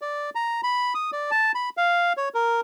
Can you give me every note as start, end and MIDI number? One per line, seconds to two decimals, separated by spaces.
0.02 0.30 74
0.35 0.61 82
0.63 0.94 83
0.95 1.11 87
1.12 1.31 74
1.31 1.52 81
1.55 1.69 83
1.77 2.13 77
2.17 2.29 73
2.34 2.61 70